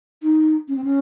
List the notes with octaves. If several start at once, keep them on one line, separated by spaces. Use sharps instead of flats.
D#4
C#4
C4
C#4